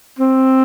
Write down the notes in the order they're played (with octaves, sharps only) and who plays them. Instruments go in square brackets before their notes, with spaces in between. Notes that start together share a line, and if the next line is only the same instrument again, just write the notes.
[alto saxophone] C4